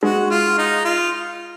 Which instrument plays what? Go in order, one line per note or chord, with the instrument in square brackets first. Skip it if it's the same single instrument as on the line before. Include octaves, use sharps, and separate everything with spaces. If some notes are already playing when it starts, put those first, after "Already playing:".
[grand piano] G#3 [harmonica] F#4
[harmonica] F4
D#4
F4